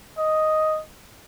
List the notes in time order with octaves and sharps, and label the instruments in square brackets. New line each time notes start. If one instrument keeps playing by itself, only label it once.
[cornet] D#5